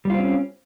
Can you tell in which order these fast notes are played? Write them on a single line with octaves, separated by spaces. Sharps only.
G3 F4 C4 C#4